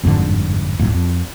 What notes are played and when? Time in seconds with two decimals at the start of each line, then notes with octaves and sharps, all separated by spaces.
0.03 G1 F2 G#2 D3
0.79 D1 G1 A2
0.94 F2